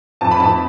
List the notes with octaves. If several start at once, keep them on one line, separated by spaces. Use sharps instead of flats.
F2 A5
B5
F2 A5